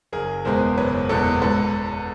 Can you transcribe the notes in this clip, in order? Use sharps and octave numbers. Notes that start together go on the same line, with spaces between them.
F#1 G#4 A#4
E2 B2 G#3 B3 A#4 C5
F#1 B4 C#5
E2 B2 G#3 B3 A4
G#2 A4 B4